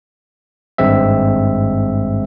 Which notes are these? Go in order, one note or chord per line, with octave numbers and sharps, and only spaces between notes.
G#1 G2 G#3 C4 E5